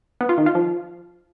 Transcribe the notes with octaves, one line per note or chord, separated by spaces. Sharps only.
B3
F4
D#3
F4
F3